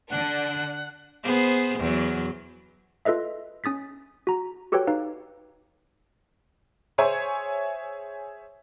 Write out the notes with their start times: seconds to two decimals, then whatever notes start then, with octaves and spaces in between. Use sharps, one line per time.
0.10 D3 D4 F#5
1.24 B3 G#4 C5
1.79 E2 F#3
3.05 F4 A4 B4 D#5 E5
3.64 C#4 D#6 A6 B6
4.27 F#4 A#5
4.72 F#4 G4 A4 B4 C#5 G5
4.87 D#4 B4 F5
6.98 G#4 C5 C#5 E5 G#5